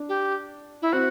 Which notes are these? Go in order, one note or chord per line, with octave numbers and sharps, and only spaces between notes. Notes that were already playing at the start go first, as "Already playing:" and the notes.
Already playing: D4
G4
E4
C4 F#4